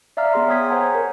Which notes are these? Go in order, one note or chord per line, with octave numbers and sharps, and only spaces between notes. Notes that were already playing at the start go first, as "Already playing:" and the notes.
D5 E5 F5 A#5 F6
B3 G#4 C6
C#5 G5 C6 D#6 G#6 B6
C5 C#5 F#5 G#5 A#5
A#4